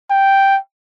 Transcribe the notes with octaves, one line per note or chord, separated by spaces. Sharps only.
G5